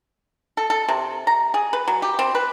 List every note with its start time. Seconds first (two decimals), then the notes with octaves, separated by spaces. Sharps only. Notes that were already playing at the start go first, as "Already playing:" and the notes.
0.57 A4
0.70 A4
0.88 C3
1.27 A#5
1.54 G#4
1.73 B4
1.88 F#3
2.02 G4
2.19 C4
2.35 B4